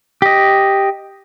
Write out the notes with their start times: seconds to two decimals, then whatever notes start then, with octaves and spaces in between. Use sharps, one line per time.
0.22 G4 D#5